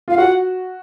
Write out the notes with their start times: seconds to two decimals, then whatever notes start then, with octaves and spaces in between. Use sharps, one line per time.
0.08 F4 F5
0.17 F#4 F#5